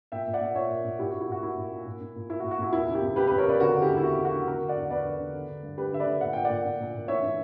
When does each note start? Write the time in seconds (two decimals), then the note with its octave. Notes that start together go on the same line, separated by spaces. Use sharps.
0.12 A#2 E5 G5
0.27 A#2
0.33 D5 F#5
0.41 A#2
0.55 A#2 C#5 E5
0.70 A#2
0.84 A#2
0.99 A#2 E4 G4
1.11 F#4
1.13 A#2
1.21 E4
1.29 A#2 F#4
1.42 A#2 E4
1.57 A#2
1.72 A#2
1.86 A#2
2.01 A#2
2.16 A#2
2.30 A#2 E4
2.40 F#4
2.44 A#2
2.51 F#4
2.59 A#2 E4
2.73 E2 E4
2.88 C#3
2.95 E4 G4
3.02 E2
3.16 E3 G4 B4
3.27 G4 B4
3.31 E2
3.38 A#4 C#5
3.45 C#3 B4 D5
3.60 D3 F#4 A#4
3.75 D3
3.82 E4 G4
3.89 E2
3.97 E4
4.03 E2 F#4
4.18 D3
4.25 F#4
4.33 D3
4.47 D3 F#4 A#4
4.61 D3
4.68 D5 F#5
4.77 E2
4.90 E2 B4 D5
5.05 D3
5.20 D3
5.34 D3
5.49 D3
5.63 G2
5.78 G2 G4 B4
5.92 D3 E5
6.00 B4 D5
6.06 D3
6.21 A#2 F#5
6.33 A#2 G5
6.45 D5 F#5
6.50 A#2
6.65 A#2
6.80 A#2
6.94 A#2
7.08 E3 C#5 E5
7.23 E3